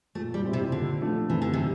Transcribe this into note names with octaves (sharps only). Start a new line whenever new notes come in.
A#2 A3
G3
G3 C4 E4
C3
A#2 D3
F3 A3 D4
C3 E3
D3
C3 G3